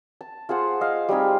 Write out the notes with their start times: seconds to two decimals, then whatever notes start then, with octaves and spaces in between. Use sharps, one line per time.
0.21 A5
0.49 F4 G#4 C5 F#5
0.81 D#5 F5
1.09 G3 C4 D#4 G#4